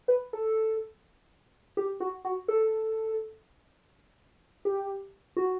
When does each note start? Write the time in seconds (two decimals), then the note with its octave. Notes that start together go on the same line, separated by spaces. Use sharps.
0.08 B4
0.33 A4
1.77 G4
2.00 F#4
2.25 F#4
2.48 A4
4.65 G4
5.37 F#4